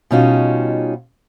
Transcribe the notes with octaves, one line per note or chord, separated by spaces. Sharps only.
B2 G3 C#4 D#4 F4 F#4